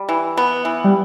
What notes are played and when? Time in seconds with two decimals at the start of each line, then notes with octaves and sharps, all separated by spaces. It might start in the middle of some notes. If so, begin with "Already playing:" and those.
Already playing: G3
0.09 E3
0.37 B3
0.65 E3
0.84 G3